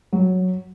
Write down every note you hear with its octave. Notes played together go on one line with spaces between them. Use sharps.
F#3